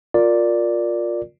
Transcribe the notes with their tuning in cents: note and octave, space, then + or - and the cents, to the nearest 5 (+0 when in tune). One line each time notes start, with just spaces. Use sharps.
F4 +20 A#4 +0 D5 +0